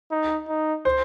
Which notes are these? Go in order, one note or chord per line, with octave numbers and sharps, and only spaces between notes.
D#4
D#4
C5